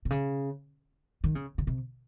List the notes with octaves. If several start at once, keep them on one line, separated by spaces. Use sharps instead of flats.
C3
C#3
D#3
C#3
C#3
C3